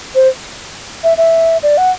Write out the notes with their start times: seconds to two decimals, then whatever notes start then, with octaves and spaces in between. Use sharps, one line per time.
0.15 C5
1.04 E5
1.18 E5
1.63 D5
1.78 F#5